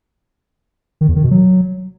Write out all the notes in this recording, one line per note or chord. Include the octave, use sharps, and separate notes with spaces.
D#3
E2
D#3
B2
F#3